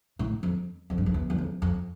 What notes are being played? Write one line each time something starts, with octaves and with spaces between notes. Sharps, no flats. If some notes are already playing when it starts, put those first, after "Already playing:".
A2
F2
F2
G2
F2
E2
E2
F2
F2